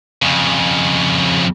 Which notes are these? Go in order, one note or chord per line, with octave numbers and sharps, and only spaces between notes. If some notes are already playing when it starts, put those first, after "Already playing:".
F2 C#3